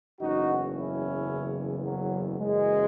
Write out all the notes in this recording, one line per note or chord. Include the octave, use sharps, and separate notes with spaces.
F#1 E2 C#3 D#4 F#4
C#4 E4
F#3
F#1 F#2 E3 G#3